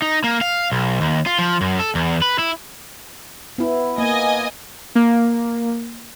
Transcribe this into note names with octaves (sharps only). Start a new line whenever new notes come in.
D#4
A#3
F5
B1
D#2
F4
F3
F#2
A4
E2
B4
E4
B3 E4
A#3 D#5 G#5
A#3